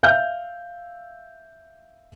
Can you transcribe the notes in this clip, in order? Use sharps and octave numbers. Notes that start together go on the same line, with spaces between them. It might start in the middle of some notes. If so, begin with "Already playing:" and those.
E5 F5 F6 G6